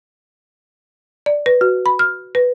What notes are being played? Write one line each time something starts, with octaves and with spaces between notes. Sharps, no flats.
D5
B4
F#4
B5
F6
B4